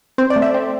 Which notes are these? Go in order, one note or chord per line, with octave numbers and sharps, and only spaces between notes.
C4 C5
D5
A3
E5
C4